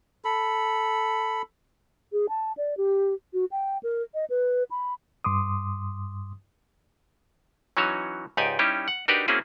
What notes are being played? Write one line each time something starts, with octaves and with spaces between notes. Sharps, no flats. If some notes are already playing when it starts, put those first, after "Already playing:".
A4 B5
G#4
A5
D5
G4
F#4
G5
A#4
D#5
B4
B5
G2 C6 D6 D#6
E3 F#3 C#4 D#4 F#4 C#5
C#2 G#2 D#4 G4 D5 G#5
G3 C#4 D#4 E4 G4
F#5
D4 D#4 F#4 G4 A#4 B4
A#3 C4 C#4 E4 F#4 G#4